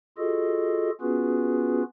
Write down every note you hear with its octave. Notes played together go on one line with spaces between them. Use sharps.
F4 F#4 G#4 A4 D#5
B3 C#4 F4 F#4 G#4 B4